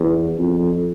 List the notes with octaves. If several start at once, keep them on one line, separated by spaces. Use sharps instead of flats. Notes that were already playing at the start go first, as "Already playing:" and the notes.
Already playing: E2
F2